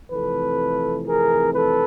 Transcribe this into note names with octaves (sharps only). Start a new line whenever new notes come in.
F2 C3 E3 A3 A4 B4
G#4 A#4
A4 B4